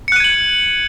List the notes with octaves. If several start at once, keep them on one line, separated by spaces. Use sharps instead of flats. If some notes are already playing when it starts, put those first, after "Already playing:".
F#6 G#6 C#7 D#7 F#7